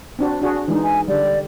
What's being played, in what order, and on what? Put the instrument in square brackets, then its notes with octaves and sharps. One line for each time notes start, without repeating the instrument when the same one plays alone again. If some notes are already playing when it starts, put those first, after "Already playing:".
[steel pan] C4 D4 F#4
D4 F#4 G#4
[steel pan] E3 G#3 D#4 [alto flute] D4
[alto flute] G#5
[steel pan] D3 G3 [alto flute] D5